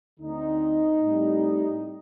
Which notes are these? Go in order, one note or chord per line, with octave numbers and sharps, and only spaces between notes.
D2 D3 A3 C4 D#4
A2 G3 C4